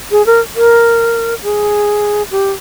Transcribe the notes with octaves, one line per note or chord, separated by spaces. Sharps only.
G#4
A#4
A#4
G#4
G4